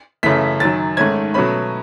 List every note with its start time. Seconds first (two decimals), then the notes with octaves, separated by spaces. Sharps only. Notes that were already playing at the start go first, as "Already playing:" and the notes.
0.23 F#2 C#3 E3 A3 B6
0.60 F#2 D#3 F#3 A6
0.97 G#2 D#3 A3 C#4 G#6
1.34 B2 F#3 A3 C#4 B5